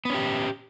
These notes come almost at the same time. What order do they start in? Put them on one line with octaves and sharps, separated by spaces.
B3 C#4 G4